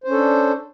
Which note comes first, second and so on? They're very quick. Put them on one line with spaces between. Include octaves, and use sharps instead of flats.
C5 C#4 A4 D4